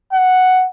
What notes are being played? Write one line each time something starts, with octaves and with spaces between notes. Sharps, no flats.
F#5